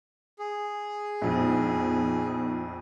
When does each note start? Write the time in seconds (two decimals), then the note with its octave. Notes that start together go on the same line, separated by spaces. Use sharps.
0.39 G#4
1.22 A#1 F2 B3 D#4